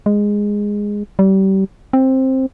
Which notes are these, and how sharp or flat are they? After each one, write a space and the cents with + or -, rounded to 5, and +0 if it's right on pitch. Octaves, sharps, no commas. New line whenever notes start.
G#3 -10
G3 -30
C4 +10